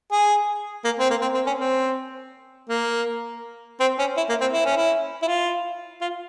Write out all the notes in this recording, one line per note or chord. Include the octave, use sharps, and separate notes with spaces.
G#4
A#3
C4
A#3
C4
C4
C#4
C4
A#3
C4
C#4
E4
A#3
C4
E4
C#4
E4
E4
F4
F4